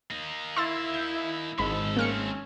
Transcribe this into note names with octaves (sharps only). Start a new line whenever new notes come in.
A#3 D#4
E4 E5 C6 E6 A6
G6
G#1 G#2 G#3 C#4 A4 B5
A3 A#3 C4 C#4 F6 C#7